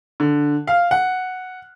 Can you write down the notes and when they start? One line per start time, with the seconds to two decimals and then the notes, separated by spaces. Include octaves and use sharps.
0.20 D3
0.67 F5
0.91 F#5